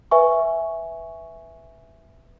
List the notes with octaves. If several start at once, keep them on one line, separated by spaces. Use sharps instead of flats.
B4 E5 G#5 C#6